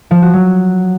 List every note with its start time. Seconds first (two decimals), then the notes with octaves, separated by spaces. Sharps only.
0.11 F3
0.22 F#4
0.34 F#3